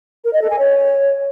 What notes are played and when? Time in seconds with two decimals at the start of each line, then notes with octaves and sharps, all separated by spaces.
0.25 A#4
0.33 D#5
0.42 A4
0.50 G#5
0.59 C#5